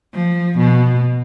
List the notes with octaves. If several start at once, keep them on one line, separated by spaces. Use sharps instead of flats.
F3
B2